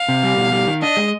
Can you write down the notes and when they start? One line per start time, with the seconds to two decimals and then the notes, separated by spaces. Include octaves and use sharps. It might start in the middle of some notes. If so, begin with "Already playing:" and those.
Already playing: F5
0.09 C3
0.23 G3
0.37 B2
0.52 G3
0.67 D#3
0.82 D4 D#5
0.97 G#3